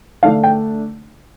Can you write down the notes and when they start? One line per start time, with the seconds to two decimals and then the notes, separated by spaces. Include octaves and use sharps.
0.23 D3 A3 D4 F5
0.44 G5